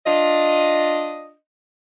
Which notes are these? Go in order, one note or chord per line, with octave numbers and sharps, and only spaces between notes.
D4 F4 D#5